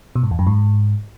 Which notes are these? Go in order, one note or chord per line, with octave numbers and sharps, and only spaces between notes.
B2
G#2
E2
F#2
G#2